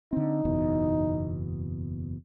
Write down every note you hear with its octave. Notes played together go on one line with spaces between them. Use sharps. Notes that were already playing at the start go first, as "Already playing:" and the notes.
D3 C4 D#4
F#1 E2 B2